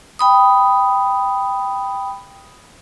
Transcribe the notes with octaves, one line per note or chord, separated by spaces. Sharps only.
G5 B5 D#6